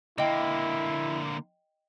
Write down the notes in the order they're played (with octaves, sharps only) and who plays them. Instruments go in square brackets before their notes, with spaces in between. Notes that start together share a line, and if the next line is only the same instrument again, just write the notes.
[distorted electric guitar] D3 A#3 [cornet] E4 [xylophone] D#5 G5